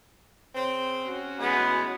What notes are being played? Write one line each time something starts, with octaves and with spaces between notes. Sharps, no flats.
C#3 C4
C#4 F#4
A2 E3 G#3 B3